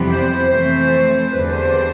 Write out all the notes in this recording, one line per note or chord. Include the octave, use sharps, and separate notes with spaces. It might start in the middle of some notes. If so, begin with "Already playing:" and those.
Already playing: F2 C3 E3 G3 B3
C5
F2 E3 A3 C4 C5
E2 D3 G3 B4
C5